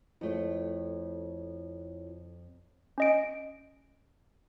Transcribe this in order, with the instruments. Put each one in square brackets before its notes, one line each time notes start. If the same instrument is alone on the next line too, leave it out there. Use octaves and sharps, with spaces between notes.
[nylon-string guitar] F2 A3 [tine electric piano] E4 F4 C#5
[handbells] C#4 D#5 D7